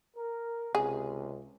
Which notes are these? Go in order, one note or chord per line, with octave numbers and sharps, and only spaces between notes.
A#4
C#2 C3 G#4